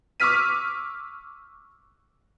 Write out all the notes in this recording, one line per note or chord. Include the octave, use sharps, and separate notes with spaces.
C#6 D6 E6 F6 B6 D#7